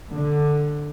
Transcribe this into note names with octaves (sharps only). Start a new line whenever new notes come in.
D3